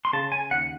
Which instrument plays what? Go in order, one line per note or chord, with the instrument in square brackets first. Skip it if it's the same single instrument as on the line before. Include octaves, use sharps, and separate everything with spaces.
[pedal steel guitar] C6
[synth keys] C#3 [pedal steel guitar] A5
[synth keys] C#3 [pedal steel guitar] G#5
[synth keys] D#2 [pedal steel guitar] F#5